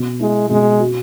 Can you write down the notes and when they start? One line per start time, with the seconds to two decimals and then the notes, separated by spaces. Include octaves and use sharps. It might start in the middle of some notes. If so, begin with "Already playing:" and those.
Already playing: B2
0.20 G#3 E4
0.50 B2 G#3
0.80 F#4